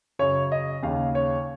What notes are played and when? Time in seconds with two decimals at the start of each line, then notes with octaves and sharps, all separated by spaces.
0.19 F#2 C#3 C#5
0.52 D#5
0.83 D#2 C#3 F5
1.15 C#5